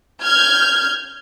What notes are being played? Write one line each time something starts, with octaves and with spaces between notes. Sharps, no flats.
F6 G6 G#6